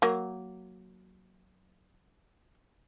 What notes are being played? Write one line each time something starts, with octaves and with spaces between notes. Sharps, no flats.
F#3 A#3